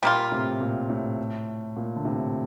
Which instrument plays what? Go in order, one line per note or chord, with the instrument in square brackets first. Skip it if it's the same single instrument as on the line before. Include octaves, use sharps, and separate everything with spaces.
[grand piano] A#2 [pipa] G3 A#3 F4
[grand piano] A2 C3
A#2
A2
A#2
D3
A2 C3